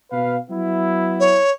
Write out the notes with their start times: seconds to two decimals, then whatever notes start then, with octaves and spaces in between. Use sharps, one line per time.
0.12 B2 B4 F5
0.51 F#3 B3 E4
1.20 C#5